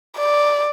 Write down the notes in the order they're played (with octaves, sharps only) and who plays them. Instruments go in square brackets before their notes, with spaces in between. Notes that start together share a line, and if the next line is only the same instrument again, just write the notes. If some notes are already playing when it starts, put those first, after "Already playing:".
[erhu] D5